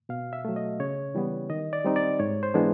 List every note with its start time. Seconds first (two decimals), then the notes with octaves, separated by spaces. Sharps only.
0.09 B2 F5
0.33 E5
0.45 F#3 A3
0.56 D#5
0.80 C#3 C#5
1.15 E3 G3 B3
1.50 D#3 D#5
1.73 D5
1.85 G3 C4 D#4
1.96 D5
2.19 G#2 C#5
2.43 C5
2.54 E3 G#3 B3 D4